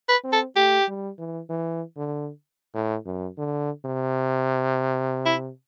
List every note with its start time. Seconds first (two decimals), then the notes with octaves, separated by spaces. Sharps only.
0.09 B4
0.24 C4
0.32 A4
0.56 A3 G4
0.88 G3
1.18 E3
1.49 E3
1.97 D3
2.75 A2
3.06 F#2
3.38 D3
3.85 C3
5.26 E4